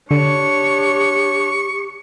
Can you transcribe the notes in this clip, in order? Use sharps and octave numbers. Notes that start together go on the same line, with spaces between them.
D3 D4 G4 C#5 C#6